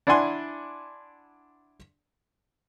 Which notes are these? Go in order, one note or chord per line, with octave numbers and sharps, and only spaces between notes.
D4 E4 D5 F#5 G#5 C6